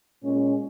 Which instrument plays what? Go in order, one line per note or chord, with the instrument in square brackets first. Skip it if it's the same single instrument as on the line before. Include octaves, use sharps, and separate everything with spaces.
[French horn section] A#2 G#3 C#4